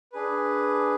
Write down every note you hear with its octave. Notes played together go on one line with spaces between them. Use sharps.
D4 G#4 B4